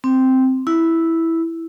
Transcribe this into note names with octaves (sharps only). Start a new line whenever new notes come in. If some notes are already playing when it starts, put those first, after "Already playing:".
C4
E4